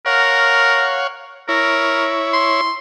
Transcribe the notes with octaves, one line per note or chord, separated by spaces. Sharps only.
A#4 C#5 F5 F#5
E4 A#4 C#5
C6